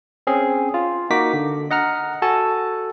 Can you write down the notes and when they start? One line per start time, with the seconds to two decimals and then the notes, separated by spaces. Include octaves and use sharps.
0.27 C4 C#4 G#4
0.74 F4
1.10 A#3 D#4 F#4 D6 B6
1.33 D3
1.71 D#5 F#5 A#5 F6
2.22 F#4 A4 G#5 A5